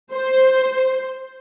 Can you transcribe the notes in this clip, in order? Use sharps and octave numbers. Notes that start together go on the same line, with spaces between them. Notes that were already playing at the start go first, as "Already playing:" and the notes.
C5